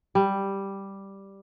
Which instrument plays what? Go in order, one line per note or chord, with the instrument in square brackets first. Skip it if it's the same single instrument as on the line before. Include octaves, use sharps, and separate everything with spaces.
[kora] G3